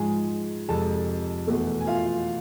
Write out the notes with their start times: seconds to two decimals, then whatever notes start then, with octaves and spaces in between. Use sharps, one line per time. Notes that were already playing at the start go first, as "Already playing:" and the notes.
Already playing: G#2 F3 G#3 G#4 G#5
0.68 F2 C3 G#3 A4 A5
1.47 E2 B2 A3
1.80 G#5
1.87 F4 F5